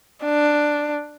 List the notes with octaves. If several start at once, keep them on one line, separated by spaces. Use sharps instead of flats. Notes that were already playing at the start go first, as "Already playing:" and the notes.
D4